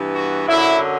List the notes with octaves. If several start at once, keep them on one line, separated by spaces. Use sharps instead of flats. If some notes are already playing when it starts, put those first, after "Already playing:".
Already playing: G2 E3 B3
F#4
F#2 D3 F#3 E4